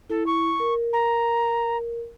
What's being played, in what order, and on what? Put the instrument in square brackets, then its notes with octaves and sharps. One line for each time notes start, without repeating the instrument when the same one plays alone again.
[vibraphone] E4 [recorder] A4
[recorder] C#6
[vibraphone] A#4
[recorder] A#5